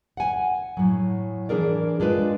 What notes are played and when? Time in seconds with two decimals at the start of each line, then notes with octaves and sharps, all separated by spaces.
0.17 F#5 G#5
0.77 A2 F#3
1.49 E3 D4 G#4 A#4 D5
2.00 G#3 D4 F4 B4